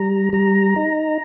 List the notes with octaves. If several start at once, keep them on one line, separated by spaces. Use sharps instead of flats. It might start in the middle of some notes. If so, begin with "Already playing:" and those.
Already playing: G3 A#5
G3 A#5
D#4